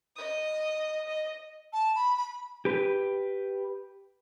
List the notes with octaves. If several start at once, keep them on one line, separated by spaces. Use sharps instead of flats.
D#5 D#6
D#5
A5
B5
B5
G4 B4